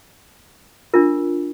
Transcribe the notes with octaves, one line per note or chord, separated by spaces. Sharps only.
D4 F4 A#4